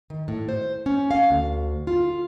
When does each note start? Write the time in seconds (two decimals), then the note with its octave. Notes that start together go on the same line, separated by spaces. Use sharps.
0.10 D#3
0.28 A2
0.49 C5
0.86 C#4
1.11 F5
1.31 D2
1.87 F4